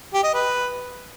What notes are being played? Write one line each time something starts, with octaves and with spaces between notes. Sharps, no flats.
G4
D#5
B4